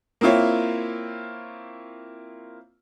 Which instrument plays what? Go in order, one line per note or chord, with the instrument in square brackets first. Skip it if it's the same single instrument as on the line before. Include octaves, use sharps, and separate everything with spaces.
[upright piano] A#3 C4 E4 F4 C#5